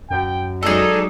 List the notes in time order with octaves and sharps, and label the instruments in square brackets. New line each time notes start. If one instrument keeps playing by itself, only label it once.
[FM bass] F#2 [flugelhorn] G5
[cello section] F#3 G#3 D#4 [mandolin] G#4 A4 [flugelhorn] D5